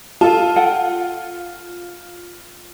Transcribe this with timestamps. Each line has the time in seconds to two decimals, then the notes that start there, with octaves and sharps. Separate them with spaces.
0.21 F4 A4 A5
0.56 A4 F#5 G5